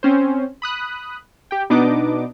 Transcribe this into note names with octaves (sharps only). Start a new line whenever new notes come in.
C4 C#4 C5
B5 D#6 F#6
G4 G5
B2 B3 D4 D#4 D#5 D6